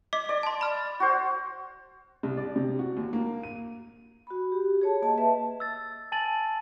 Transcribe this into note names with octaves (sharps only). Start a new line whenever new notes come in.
D#5 D6 B6
D5
A5 C6
B5 F6
F#4 C5
C2
D5
C3
F#4
D#2
A#3
D#7
F#4 B5
G4
G#4 C#5 A5
A#3 D#5 A5
B4 E5 A5
E6 A6
G#5 A5 A6 F#7